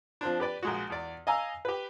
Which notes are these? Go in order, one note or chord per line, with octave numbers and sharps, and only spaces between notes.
F3 C4 D4
G4 B4 D5
A#1 G#3 F#4
E2 D5
D#5 F5 G#5 A#5 E6
G4 B4